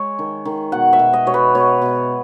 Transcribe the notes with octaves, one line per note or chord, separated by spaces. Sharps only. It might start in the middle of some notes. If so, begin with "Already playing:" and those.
Already playing: G#3 C#5
D#3
D#3
B2 F#5
E5
B2
D#5
B2 C#5
B4
B2 C#5
B2